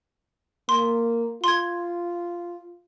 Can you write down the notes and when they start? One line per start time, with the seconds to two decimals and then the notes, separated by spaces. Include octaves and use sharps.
0.69 A#3 C6
1.44 F4 C6 G#6